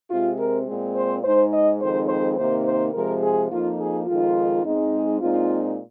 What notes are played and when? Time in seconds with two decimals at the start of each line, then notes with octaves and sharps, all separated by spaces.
0.11 C3 G#3 C4 F4
0.39 A#4
0.67 A#2 G#3 C4
0.95 C5
1.24 G#2 G#3 D#4 C5
1.53 D#5
1.81 F2 D#3 G#3 C4 D#4 C5
2.09 C5
2.37 C3 D#3 A#3 D#4 C5
2.66 C5
2.94 C3 F3 G#3 A#4
3.23 G#4
3.51 F2 F3 A#3 D#4 F4
3.80 G#4
4.07 F2 D#3 G#3 D#4 F4
4.64 G#2 G#3 C4 D#4
4.93 G#4
5.21 A#2 G#3 C4 D#4 F4